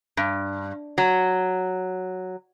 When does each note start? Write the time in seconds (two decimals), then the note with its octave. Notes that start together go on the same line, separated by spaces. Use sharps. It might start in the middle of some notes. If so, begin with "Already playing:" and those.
0.17 G2
0.98 F#3